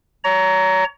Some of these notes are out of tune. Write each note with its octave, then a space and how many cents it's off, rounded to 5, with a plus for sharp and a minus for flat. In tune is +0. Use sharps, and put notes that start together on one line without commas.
C#5 +35 A#5 +0